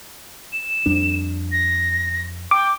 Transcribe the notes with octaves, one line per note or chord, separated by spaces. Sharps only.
E7
F2 G3 D4
A#6
G5 D6